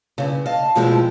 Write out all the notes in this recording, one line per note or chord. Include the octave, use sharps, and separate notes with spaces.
G2 C#3
D#5 F5 A5
D2 B2 F3 G#3 E4 G5